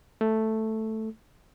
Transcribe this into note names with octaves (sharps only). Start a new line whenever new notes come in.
A3